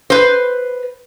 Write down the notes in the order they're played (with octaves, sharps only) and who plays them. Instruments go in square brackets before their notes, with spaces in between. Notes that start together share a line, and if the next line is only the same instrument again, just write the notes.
[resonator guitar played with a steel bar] B4 C5